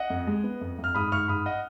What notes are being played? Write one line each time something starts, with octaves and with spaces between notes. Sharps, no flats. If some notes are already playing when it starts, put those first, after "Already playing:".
Already playing: D#5 F#5
F2
G#3
B3
F2
F2
F6
G#2 B5 D#6
G#2 C#6 F6
G#2 B5 D#6
D#5 F#5